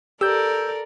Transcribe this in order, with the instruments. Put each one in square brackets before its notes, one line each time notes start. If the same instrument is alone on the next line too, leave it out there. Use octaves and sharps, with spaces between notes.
[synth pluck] G4 [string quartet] A4 A#4 D5 [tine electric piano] E6 G6